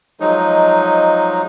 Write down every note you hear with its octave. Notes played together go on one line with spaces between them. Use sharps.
F3 F#3 G#3 D#4